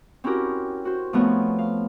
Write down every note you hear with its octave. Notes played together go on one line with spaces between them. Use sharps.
C4 C#4 E4 F#4 G4 A#4
F#4 C5
F3 A3 B3 C4 D#4 C#5
F5